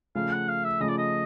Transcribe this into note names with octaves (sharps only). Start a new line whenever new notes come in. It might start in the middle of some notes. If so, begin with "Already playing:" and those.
C#3 F3 A3 F5
F#5
F5
E5
C#3 F3 A3 D#5
D5
D#5